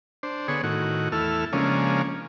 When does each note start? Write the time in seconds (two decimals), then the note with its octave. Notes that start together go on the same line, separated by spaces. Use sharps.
0.23 D4 C5
0.48 D3 B3 G#4 C#5
0.63 A2 D#3 F#4
1.12 E2 A3 E4 A4 F6
1.53 C#3 F3 G#3 A#3 C#4 D4